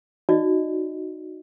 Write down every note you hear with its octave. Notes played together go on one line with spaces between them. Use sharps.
D#4 F#4 D5 D#5